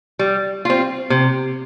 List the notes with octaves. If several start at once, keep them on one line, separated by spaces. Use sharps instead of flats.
G3
C4 F4
C3